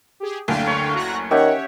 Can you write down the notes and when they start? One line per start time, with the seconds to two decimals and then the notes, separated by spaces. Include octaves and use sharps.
0.20 G4 G#4
0.48 F#1 D2 D3 F5 G5
0.67 C#5 C#6
0.94 F#4 A#5 F#6
1.31 D#3 C#4 G4 C#5 E5 F#5